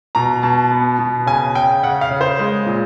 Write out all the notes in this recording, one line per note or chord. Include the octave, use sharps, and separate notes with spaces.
B2 A#5
B2 A5
B3
B2
C#3 G#5
C#3 G5
C#3 F#5
F5
C#3
C5
G#3
A#2